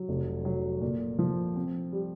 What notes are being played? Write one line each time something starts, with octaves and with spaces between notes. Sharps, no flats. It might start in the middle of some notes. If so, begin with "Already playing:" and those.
Already playing: F#3
F1
F#3
A#2
F3
C4
G3